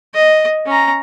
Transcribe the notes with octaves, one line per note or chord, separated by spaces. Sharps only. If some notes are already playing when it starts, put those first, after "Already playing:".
D#5
C#4 A#5